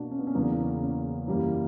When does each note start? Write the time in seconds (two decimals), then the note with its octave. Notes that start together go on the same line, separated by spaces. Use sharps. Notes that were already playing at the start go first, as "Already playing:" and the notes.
Already playing: B2 A#3 D4 F#4
0.11 C#4
0.19 B3
0.27 C#4
0.34 E2 C#3 F#3 A#3 B3
0.58 C#4
0.82 C#4
1.27 F#2 E3 G3 A#3